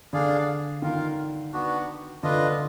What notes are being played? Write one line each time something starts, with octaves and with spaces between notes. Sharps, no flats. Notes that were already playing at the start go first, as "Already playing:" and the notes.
D3 D4 G#4 D5 F5
D#3 F4 A#4 F5
B3 D4 F#4
D3 D4 F4 B4 D#5